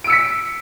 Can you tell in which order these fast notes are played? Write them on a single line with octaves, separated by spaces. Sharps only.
D7 E6 C#7 B6